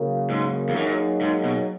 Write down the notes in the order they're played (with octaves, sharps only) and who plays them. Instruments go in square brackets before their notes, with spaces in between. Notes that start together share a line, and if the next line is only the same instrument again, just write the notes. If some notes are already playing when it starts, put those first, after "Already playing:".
Already playing: [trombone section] C#3 F#3 A#3
[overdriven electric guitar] G#2
E2
[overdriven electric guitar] F#2 [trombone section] F#3 A#3 D#4 G#4
[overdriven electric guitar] G#2
B2